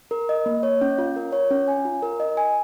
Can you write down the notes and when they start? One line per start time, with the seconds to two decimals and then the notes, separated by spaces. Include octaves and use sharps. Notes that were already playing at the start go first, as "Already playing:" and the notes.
0.11 A#4
0.29 D#5
0.46 A#3
0.63 C#5
0.81 C#4
0.98 F4
1.16 A#4
1.33 C#5
1.51 C#4
1.68 G#5
1.85 F4
2.03 A#4
2.20 D#5
2.37 G#5